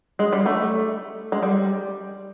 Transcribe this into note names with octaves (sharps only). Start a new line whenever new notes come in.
G#3
G3
A3
G#3
G3